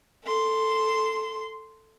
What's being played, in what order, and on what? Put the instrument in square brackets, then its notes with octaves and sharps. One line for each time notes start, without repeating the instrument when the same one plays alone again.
[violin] A4 C6